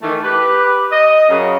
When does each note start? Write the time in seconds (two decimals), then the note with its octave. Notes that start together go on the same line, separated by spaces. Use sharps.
0.02 D#3 E3 A3
0.23 G4 B4
0.92 D#5
1.29 F#2 C#3